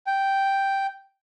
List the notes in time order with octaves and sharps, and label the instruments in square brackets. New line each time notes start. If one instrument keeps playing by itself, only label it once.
[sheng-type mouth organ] G5